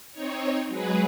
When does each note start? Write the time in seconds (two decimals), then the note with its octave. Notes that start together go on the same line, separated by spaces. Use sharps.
0.13 C4 D#4 C#5
0.68 F#3 G#3 G#4 B4